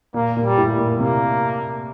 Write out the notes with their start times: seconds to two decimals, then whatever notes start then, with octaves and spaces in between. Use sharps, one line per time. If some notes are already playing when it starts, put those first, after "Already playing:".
0.14 A#2 A#3
0.36 A#2
0.43 G3
0.57 A2
0.78 A#2
0.99 C3 A#3